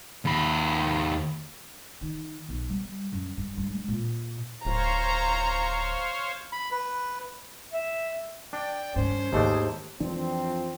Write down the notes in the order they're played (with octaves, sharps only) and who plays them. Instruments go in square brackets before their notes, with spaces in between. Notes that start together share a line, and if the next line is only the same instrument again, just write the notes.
[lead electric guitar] D#2 B5
[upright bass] D#3
B1
G3
F#2
G2
G2
G#3
A#2
[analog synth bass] D1 [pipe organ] C5 C#5 F5 [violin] A#5
[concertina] B5
B4
[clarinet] E5
[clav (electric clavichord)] D4 [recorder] D5 [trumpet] G5
[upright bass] G2 D#3 [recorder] C#4 [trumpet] C5
[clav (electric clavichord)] D#2 A3 D4 [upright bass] G#2 D#3 [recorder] G#4
[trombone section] F2 F3 C4 [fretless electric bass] E3 D4